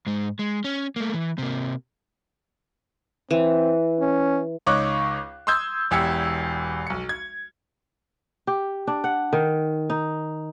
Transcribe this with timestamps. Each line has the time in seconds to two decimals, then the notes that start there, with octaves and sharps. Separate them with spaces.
0.06 G#2 G#3
0.39 G#3
0.64 C#4
0.96 A3 A#3
1.14 E3
1.38 C3 A#3
3.31 E3 C4
4.00 C#4
4.66 C#2 D#4 C#5 C#6 D6 F#6
5.47 C6 D#6 E6 G6 G#6
5.91 E1 E2 G4 E6 G#6 C#7
6.87 B1 C#7
7.09 G#6
8.47 G4
8.87 D4
9.04 F#5
9.33 D#3
9.90 D#4